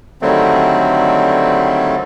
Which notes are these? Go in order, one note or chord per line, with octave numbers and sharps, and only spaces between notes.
D3 D#3 F#3 G3 A3 C4